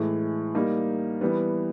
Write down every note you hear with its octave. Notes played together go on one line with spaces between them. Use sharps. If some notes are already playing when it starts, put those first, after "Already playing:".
Already playing: A2 E3 G#3
G3 A#3 D#4
E3 G3 B3